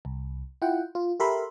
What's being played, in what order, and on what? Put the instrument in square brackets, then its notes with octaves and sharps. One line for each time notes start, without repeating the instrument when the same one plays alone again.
[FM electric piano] C2
E4 F4 F#5 G5
F4
G4 A4 A#4 E5 B5 C6